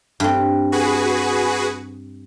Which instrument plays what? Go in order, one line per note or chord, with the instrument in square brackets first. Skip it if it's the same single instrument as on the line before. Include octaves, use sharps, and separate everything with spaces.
[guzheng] G2 C4
[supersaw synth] F#4 G#4 B4